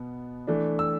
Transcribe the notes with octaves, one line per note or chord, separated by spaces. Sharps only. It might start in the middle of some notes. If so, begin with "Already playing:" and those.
Already playing: B2 B3
E3 A3 D4
E6